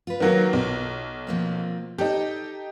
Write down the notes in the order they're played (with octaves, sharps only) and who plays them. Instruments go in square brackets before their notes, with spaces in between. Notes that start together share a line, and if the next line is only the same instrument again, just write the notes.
[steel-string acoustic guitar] F4 B4
[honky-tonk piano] D#3 F#3 A#3
B1
[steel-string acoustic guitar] F3 A#3 C4
[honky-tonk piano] D#4 G4 [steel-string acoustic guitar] A4